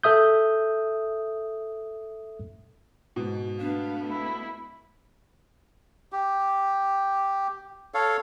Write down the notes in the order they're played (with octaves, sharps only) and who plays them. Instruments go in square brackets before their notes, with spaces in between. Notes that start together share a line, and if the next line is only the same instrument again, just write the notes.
[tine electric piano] A4 E5 D#6 G6
[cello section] G#2 [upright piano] B2
[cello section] A3 B3 [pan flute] D4 [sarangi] F5
[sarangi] E4
[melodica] G4
A4 C#5 F5